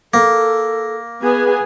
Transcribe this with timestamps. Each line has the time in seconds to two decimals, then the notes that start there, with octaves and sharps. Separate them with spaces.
0.14 A#3 A4
1.22 B3 G#4 B4 G#5